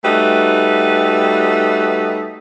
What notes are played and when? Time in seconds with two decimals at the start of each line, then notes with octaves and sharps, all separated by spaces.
0.05 G3 A3 D#4 F#4 B4